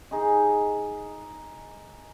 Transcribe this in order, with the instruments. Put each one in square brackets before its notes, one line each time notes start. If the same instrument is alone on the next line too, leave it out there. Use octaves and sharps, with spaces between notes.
[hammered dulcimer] D#4 G#4 D#5